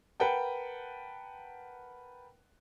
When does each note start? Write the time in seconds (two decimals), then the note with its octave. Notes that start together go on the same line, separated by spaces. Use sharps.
0.20 A#4 B4 F#5 G5 A5